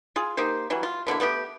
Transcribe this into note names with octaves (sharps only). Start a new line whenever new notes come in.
F4 G#4
A#3 D#4 G4 C5
E3 F#3 G3
F4
B2 D3 A#3 E4
A3 B3 F4 G4